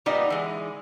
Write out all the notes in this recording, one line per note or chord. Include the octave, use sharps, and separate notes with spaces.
A#2 G3 B3 D#4 D5 A#5
E3 G#3